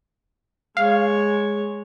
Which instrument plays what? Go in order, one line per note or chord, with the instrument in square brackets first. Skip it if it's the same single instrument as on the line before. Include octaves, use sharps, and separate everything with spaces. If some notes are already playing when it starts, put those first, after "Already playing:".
[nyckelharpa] G#3 C#5 [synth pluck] F5